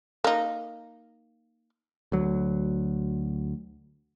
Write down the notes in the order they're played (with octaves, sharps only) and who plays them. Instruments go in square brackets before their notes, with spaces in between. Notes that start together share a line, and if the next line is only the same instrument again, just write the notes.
[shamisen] A#3 D#4
[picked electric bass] D2 F#3